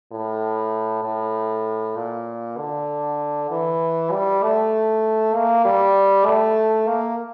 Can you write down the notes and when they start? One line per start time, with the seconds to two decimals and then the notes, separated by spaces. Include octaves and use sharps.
0.12 A2
1.04 A2
1.96 A#2
2.58 D3
3.51 E3
4.12 G3
4.43 A3
5.35 A#3
5.65 G3
6.26 A3
6.88 A#3